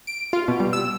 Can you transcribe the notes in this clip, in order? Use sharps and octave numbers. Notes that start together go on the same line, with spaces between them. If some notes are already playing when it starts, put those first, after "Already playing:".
D7
F4
B2
G3
E6